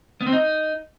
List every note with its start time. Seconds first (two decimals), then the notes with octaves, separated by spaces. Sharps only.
0.21 B3
0.27 C4
0.32 D#4